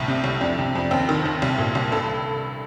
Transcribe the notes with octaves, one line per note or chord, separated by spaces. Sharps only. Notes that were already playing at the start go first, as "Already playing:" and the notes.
Already playing: C2 A2
C3
C2
F2 D4
C3
F2
D#2 C4
D#3
D#2
C2
A#2
C2
G2 A4